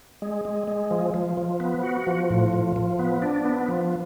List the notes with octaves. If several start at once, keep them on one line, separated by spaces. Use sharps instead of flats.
G#3
G#3
G#3
F3
F3
F3
B3
F#4
F3
A2
F3
F3
B3
D4
B3
F3